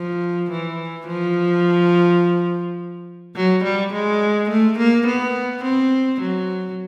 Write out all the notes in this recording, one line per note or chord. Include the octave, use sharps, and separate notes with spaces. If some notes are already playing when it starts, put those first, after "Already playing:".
Already playing: F3
E3
F3
F#3
G3
G#3
A3
A#3
B3
C4
F#3